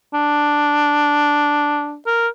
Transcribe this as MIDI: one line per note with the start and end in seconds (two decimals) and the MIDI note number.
0.14 1.97 62
2.06 2.28 70